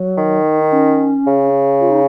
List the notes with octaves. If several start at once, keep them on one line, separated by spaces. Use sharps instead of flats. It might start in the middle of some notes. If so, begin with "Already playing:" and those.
Already playing: F#3
D#3
D#4
C#4
C#3
F4
D#4